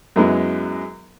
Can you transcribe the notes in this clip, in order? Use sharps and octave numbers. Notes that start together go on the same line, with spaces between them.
F#2 F#3 G#3 B3 E4